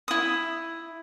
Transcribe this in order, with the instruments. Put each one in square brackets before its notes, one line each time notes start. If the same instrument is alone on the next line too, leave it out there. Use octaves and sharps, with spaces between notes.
[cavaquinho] E4 D#6